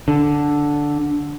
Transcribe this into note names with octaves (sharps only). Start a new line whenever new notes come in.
D3